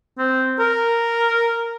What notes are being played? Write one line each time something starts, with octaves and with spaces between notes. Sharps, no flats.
C4
A#4